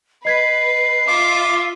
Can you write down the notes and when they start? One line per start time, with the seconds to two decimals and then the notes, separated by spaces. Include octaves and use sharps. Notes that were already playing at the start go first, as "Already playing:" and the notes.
0.25 B4 D#5 G#6 B6 C7
1.08 F4 E5 D6